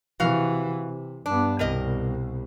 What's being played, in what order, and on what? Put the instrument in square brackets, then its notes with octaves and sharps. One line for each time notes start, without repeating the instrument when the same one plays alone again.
[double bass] C3 E3 [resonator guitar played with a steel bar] F#4 F5
[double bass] C3
[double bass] G2 B3 [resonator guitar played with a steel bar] D4
[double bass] C2 B2 [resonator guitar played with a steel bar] G3 A#4 D#5